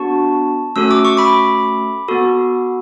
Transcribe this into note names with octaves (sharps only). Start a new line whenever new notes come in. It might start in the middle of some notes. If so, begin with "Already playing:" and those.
Already playing: B3 D4 F#4 A5 C#6
A3 C#4 F#4 A4 E6
D6
C#6
B5 D6
B3 F#4 A4